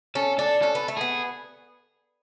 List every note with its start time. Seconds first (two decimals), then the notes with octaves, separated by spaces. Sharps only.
0.15 C#4 A4
0.39 D4 A4
0.62 C#4 A4
0.75 B3
0.88 A3
0.97 B3 G#4